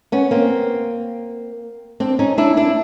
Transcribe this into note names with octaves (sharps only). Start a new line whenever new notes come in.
B3 C#4
A#3 C4
C4 D4
C#4 D#4
D4 E4
D4 E4